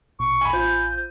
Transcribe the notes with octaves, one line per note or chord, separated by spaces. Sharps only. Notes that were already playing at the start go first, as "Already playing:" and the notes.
A#1 B2 C#6
G#5 B5
A1 F4 C5 G6